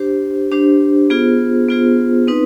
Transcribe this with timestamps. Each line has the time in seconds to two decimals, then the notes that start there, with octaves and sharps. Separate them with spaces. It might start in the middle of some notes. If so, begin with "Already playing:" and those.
Already playing: D4 G4 C5
0.52 D4 G4 C5
1.10 B3 F4 G#4 C5
1.68 B3 F4 G#4 C5
2.28 C4 D#4 B4